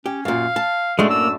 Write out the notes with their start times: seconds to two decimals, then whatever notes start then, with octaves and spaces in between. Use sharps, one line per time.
0.06 C#4 G4
0.25 F#2 A#2 F5
0.56 A5
0.99 F#2 A2 G#3 A3 D4
1.10 A#3 E6